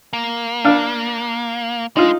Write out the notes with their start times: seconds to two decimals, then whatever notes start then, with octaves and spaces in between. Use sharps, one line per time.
0.13 A#3
0.65 D4 F5
1.97 G#3 D#4 F4